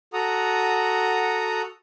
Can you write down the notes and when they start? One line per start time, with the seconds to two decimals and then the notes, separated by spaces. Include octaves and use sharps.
0.13 F#4 A4 F#5 A#5 D#6